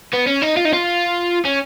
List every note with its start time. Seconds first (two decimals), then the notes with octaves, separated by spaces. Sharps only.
0.13 B3
0.27 C#4
0.42 D#4
0.57 F4
0.65 D#4
0.73 F4
1.45 C#4